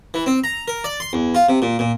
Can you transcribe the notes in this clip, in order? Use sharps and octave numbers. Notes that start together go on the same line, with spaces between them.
E3
C4
A#5
A#4
D5
C6
E2
F4
C3
A#2
A#2